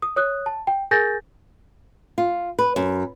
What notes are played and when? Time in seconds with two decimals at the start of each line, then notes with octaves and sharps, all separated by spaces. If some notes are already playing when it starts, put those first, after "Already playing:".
0.02 D#6
0.16 C#5 D#6 F#6
0.46 A5
0.67 G5
0.91 G#4 A#4 G#5 G6 A6 A#6
2.18 F4
2.59 B4
2.76 F#2